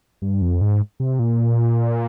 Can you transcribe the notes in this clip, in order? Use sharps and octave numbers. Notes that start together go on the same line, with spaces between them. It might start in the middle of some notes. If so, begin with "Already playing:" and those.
G2
F2
G#2
C3
A#2